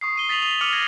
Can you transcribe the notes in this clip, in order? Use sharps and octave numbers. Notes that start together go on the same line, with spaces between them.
C#6 D#6 C7
C#6 D#7 G7
D#6 A6 B6 D#7 F7 F#7
D#6 D#7 F7
D6 F6 C#7 D#7 F7 F#7
G#6 A#6 D#7 F7